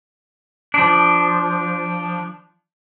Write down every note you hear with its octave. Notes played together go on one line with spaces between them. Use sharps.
F3 D4